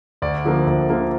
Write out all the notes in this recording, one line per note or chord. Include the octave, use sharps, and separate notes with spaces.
D2 D5
D3 F3 A#3
D2
D3 F3 A#3